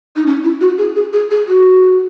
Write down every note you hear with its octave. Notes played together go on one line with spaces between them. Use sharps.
D#4
C#4
E4
F#4
G#4
G#4
G#4
G#4
F#4